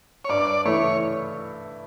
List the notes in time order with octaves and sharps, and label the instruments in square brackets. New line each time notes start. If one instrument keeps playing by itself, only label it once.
[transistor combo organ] C#5
[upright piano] G2 [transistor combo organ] D5
[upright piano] E3 A3 E4 [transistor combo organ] C#5